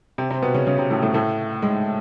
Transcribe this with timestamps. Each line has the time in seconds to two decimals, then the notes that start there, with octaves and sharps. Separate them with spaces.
0.18 C3 C4
0.30 C3 C4
0.42 B2 B3
0.54 C#3 C#4
0.67 C#3 C#4
0.78 C3 C4
0.91 A2 A3
1.02 A2 A3
1.14 A2 A3
1.62 G#2 G#3